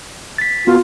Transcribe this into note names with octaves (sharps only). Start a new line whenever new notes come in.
A6 B6
B3 F4 F#4